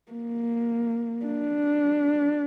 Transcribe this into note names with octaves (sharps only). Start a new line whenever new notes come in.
A#3
D4